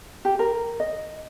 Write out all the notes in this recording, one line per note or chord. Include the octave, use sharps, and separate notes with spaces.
G4
A#4
D#5